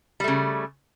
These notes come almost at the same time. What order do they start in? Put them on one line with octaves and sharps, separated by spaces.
G3 A3 C#3